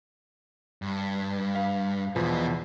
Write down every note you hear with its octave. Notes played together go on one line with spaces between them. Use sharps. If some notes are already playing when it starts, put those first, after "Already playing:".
G2
F5
E2 B2 E3 F3 B4